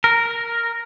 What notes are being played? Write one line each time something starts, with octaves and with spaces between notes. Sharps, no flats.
A#4